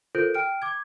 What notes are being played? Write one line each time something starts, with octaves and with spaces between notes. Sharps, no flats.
F4 A4 A#4 C5 G6 D7
G5 F6 D7
D6 G#6